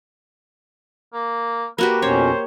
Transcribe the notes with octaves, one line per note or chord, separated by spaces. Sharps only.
A#3
A#3 F#4 G4 B4
F2 B2 C#4 C5 C#5